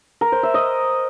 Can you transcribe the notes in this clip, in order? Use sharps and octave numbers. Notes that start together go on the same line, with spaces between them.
A#4
C5
E5
D#5